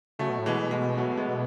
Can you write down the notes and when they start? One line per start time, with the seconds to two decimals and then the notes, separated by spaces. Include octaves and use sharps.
0.19 C#3 F#3 A3
0.29 B2
0.39 A2
0.46 B2 E3 G#3
0.71 E3 G#3
0.97 F#3 A3
1.17 G#3 B3